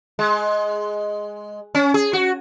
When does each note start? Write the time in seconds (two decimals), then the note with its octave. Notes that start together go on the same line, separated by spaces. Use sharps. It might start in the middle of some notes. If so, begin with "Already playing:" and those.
0.19 G#3
1.75 C#4
1.94 G#4
2.13 F#4